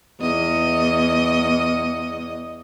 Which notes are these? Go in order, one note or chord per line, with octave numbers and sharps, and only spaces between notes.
E2 D#5